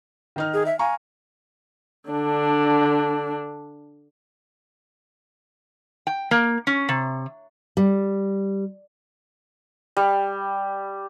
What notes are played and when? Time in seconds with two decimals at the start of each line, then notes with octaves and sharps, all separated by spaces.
0.36 D#3 D#4 F6
0.54 G#4
0.66 E5
0.79 F5 G#5 A#5 C#6
2.09 D3 D4
6.07 G5
6.31 A#3
6.67 C#4
6.89 C3
7.77 G3
9.97 G3